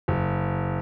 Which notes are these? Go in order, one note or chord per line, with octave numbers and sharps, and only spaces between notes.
F#1